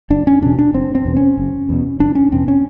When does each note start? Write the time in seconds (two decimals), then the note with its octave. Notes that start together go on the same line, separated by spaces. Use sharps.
0.10 F#1 D4
0.27 C#4
0.42 E2 B2 D4
0.59 D4
0.73 F#1 C4
0.95 C4
1.05 E2 B2
1.16 C#4
1.37 F#1
1.69 E2 B2
2.00 F#1 D4
2.15 C#4
2.32 E2 B2 C4
2.48 C#4